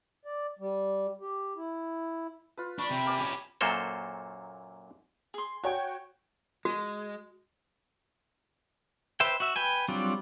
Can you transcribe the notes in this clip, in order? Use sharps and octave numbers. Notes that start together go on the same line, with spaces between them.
D5
G3
G4
E4
F4 B4
D4 B5 C#6
C3 G5
A#3 D5 G#5
C#4 G4
F#2 A#2 F#3 A#3 A4 C5
G#4 C6
F#4 C#5 G5 G#5
G#3 F#4
B4 C5 E5 G5
F#4 E5
B4 G5 G#5
F#3 G3 C4 D4 F4